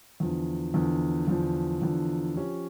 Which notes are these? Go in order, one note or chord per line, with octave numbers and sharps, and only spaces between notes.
E2 D3 F3
E2 D3 F3
E2 D3 F3
E2 D3 F3
F3 C#4 G4 C#5